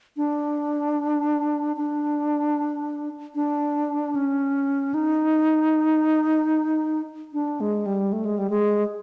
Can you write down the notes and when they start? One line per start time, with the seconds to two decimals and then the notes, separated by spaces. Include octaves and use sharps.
0.17 D4
1.77 D4
3.35 D4
4.15 C#4
4.94 D#4
7.33 D4
7.60 G#3
7.86 G3
8.13 A3
8.25 G#3
8.38 G3
8.50 G#3